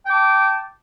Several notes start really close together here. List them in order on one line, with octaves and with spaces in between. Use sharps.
G5 D6 A5